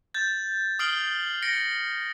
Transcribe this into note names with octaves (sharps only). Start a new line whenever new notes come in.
G6 A6
D#6 F6 C7 D7 F#7 G7
A#6 C#7 D7